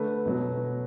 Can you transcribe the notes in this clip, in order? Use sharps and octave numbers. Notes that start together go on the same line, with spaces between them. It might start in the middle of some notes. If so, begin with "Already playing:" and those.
Already playing: D3 A3 B4
B2 F#3 B3